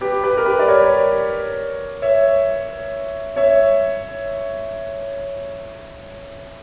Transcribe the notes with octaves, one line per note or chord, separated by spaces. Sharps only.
G4 B4
G4 B4
A#4
G4 B4
D5
A#4 C#5
C#5 E5
C#5 E5